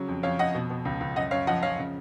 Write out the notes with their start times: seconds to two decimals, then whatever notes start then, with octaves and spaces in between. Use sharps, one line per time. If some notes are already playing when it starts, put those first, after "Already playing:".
Already playing: C#3 F#3
0.08 F2
0.23 F2 C#5 F5
0.39 F2 D#5 F#5
0.55 B2
0.70 B2
0.85 C#2
1.00 C#2
1.16 F#2 D#5 F#5
1.31 F#2 C#5 F5
1.47 F3 D#5 F#5
1.62 F3 C#5 F5
1.78 C#3